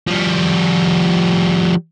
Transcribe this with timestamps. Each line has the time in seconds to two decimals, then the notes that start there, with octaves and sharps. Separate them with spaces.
0.07 F3 G3